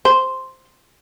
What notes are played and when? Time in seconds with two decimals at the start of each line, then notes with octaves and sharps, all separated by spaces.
0.05 C5